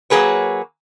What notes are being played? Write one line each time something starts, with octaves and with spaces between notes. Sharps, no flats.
F#3 A#3 G#4 B4 C#5